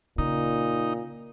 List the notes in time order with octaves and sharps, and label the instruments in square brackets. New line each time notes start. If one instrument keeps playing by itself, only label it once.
[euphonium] A#2 [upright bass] C#3 [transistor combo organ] D#4